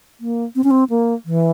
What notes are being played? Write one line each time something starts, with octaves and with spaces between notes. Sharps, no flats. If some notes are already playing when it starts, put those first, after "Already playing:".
A#3
C4
C#4
C4
A#3
E3